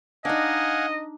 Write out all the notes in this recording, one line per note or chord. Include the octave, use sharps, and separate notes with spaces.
D4 D#4 D#5 F5 F#5 G#5